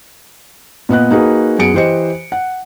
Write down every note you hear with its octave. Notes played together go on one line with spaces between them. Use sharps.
A#2 B3 D#5 F#6
A#3 D#4 F#4 G#4 B4
F#2 B3 G#4 C#7 D7
E3 G4 C5 D#5 C#7
F#5